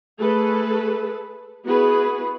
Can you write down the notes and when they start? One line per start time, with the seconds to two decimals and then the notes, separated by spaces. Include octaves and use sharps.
0.19 A3 G#4 A4 B4
1.65 B3 E4 F#4 G#4 B4